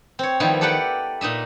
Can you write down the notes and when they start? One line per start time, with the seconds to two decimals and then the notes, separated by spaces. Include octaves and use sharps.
0.19 C4 C#5
0.40 D#3 F3 G3 B3 D#4 E4
0.61 G4 A4 B4 D5 F#5 G5
1.21 A#2 D#4 D#5 E5